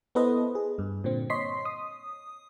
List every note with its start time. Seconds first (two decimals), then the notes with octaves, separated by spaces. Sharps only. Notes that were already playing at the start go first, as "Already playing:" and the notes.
0.15 B3 E4 A4 B4 C5 D#5
0.55 G#4
0.79 G2
1.04 A#2 D3 C4
1.30 C#5 D#5 C6 B6 C7
1.65 D#6